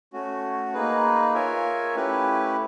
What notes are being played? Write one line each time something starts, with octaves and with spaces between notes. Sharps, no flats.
A3 C#4 F#4
A#3 D#4 G#4 B4
F4 A#4 C#5 E5 G#5
A3 C#4 E4 G4 B4